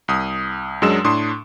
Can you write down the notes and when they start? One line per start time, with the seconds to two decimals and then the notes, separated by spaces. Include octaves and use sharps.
0.08 C2 D#6
0.82 F#2 F#3 G#3 D4 E6 E7
1.04 A2 D4 C6 D#6